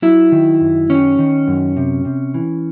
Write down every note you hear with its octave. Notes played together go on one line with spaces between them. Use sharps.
F#3 E4
D#3
F#2
D#3 C#4
D#3
F#2
C3
C3
E3